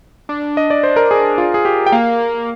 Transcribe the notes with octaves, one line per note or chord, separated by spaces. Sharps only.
D4
D#5
D5
C5
A#4
G#4
F4
G#4
G4
G5
A#3 F5